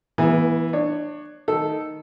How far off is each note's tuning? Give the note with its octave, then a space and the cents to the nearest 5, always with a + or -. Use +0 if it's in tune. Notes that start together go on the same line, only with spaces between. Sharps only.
E3 +0 B3 -35 G#4 -15
D4 +25 C#5 +0
D#3 +0 A4 +0